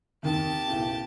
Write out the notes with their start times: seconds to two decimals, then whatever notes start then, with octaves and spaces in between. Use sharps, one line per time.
0.23 D#2 C3 D#3 G4 A5
0.68 B1 A2 C#3